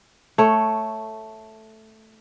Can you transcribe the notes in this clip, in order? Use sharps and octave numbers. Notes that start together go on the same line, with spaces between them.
A3 C#5